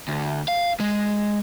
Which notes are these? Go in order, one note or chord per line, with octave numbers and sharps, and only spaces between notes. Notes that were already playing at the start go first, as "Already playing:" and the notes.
D2
F5
G#3